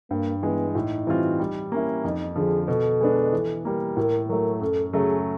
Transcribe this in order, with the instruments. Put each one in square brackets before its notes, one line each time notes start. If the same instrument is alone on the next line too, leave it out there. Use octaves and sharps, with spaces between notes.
[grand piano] G2 [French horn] A#3
[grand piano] E3 G#3 [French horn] B3
[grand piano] A2 [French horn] D#4
[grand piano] E3 G3 C4 F4
G3
A#3 C#4 E4
[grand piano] F2 [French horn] D#4
[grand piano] D3 F3 [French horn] G#4
[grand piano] B2 [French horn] A4
[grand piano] G#3 B3 D4
E3
G3 A#3
[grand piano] A2 [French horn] A#4
[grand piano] F#3 A3 [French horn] A#4
[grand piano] F#2 [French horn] A4
[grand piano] C#3 F#3 A3 [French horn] G#4